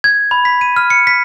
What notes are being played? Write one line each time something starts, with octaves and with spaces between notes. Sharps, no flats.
G#6
B5
B6
D#7
F6
C#7
B6